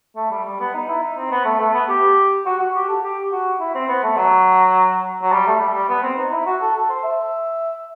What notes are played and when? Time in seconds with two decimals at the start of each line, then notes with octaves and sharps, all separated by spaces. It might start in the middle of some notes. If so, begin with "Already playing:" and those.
0.16 A3
0.30 G3
0.45 G3
0.60 B3
0.74 D#4
0.88 E4
1.02 D#4
1.17 C4
1.31 B3
1.45 A3
1.59 A3
1.74 B3
1.89 G4
2.46 F#4
2.59 F#4
2.75 G4
2.88 A4
3.03 G4
3.32 F#4
3.60 E4
3.75 C4
3.88 B3
4.03 A3
4.17 F#3
5.22 F#3
5.32 G3
5.47 A3
5.60 G3
5.74 G3
5.89 B3
6.03 C4
6.18 D#4
6.31 E4
6.46 F#4
6.61 A4
6.75 A4
6.90 C5
7.03 E5